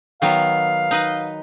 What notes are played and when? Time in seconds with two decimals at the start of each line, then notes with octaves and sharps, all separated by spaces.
0.22 D#3 F#3 B3 F5
0.91 D#4 B4 D#5